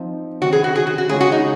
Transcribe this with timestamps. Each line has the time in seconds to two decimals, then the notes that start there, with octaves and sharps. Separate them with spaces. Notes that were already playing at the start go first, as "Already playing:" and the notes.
Already playing: F3 C4 D#4
0.41 C3 D#3 F#3 C#4 F#4
0.53 G#4
0.64 F#4
0.75 G#4
0.87 F#4
0.98 F#4
1.09 C#3 G#3 C#4 F4 G#4
1.21 F#4
1.32 D#4